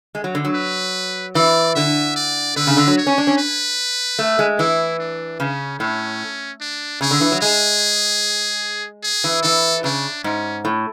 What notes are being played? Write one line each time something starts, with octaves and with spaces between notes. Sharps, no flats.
G#3
F#3
D3
F#3
B4
E3 D5
D3 E5
D5
D3 B4
C#3
D3
F#3
C#5
C#4
D4
C#4
B4
A3
G#3
E3 E4
D4
C#3 C#4
A2 C#4
D4
C#3 G#4
D3
E3
F#3
G#3 G#4
G#4
E3
E3 A4
C#3 D4
G#2 C#4
A2